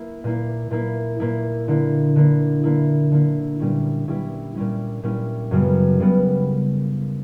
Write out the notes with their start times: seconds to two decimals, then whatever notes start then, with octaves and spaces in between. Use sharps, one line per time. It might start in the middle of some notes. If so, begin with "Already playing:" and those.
Already playing: A#3 E4
0.24 A#2 A#3 E4
0.70 A#2 A#3 E4
1.20 A#2 A#3 E4
1.68 D3 A#3 E4
2.16 D3 A#3 E4
2.64 D3 A#3 E4
3.12 D3 A#3 E4
3.59 A#2 G3 C#4 E4
4.08 A#2 G3 C#4 E4
4.55 A#2 G3 C#4 E4
5.03 A#2 G3 C#4 E4
5.51 F#2 C#3 G3 B3
6.00 C#3 G3 B3